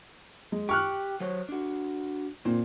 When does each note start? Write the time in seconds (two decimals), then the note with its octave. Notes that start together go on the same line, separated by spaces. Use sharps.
0.52 G#3
0.69 G4 C#6 F6 F#6
1.20 F#3 C5 C#5
1.49 D4 F#4
2.45 A#2 C4